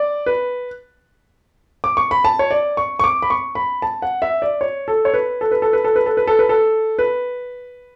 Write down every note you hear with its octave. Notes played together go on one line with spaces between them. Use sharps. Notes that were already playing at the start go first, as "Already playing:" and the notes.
Already playing: D5
B4
D6
C#6
B5
A5
C#5
D5
C#6
C#6
D6
B5
C#6
B5
A5
F#5
E5
D5
C#5
A4
C#5
B4
A4
B4
A4
B4
A4
B4
A4
B4
A4
B4
A4
B4